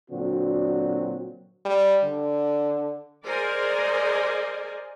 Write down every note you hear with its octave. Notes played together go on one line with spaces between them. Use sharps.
A#2 D3 F#3 C4 D4 F#4
G3
D3
G#4 A#4 C5 D5 D#5 G#5